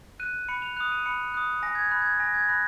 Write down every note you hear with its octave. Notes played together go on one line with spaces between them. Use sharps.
F#6 D#7
B5 C#7
F7
D#6 F#6 F7
D#7
B5 C#7
D#6 F#6
G#5 A#6
G#6
B5 F#6
G#6
G#5 A#6
G#6
B5 F#6 A#6